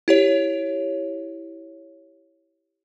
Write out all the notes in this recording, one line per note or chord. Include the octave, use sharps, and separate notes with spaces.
E4 G4 C#5